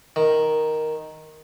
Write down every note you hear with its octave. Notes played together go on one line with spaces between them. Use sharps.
D#3